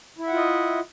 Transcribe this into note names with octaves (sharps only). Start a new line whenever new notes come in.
E4 F4 D#5 E5 F#5